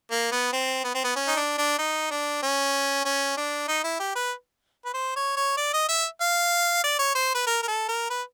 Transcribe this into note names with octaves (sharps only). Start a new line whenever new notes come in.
A#3
B3
C4
B3
C4
B3
C#4
D#4
D4
D4
D#4
D4
C#4
C#4
D4
D#4
E4
G4
B4
B4
C5
C#5
C#5
D5
D#5
E5
F5
D5
C#5
C5
B4
A#4
A#4
A4
A#4
B4